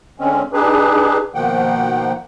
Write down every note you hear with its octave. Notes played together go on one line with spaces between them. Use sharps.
D3 G#3 C4 C#4
D4 D#4 G4 G#4 B4
B2 D#3 F3 A#3 F#5 G5